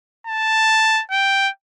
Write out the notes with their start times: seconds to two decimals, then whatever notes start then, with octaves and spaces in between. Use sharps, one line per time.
0.27 A5
1.11 G5